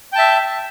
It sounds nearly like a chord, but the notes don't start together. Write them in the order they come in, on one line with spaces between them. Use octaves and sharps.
G5 A5 E5